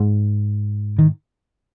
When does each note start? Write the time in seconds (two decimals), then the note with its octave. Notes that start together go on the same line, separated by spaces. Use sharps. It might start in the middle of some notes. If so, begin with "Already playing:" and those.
Already playing: G#2
0.99 D#3